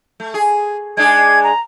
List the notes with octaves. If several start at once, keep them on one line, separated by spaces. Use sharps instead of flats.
A3
G#4
G#3 D4 G#4 G#6
A#5